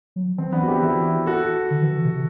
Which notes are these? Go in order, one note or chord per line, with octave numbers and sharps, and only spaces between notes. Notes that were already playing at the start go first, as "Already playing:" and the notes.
F#3
E3 C4
B3 D4
F#4
E4 G4
E3 E4 G4
F#4 A4
D3
E3
E3
C3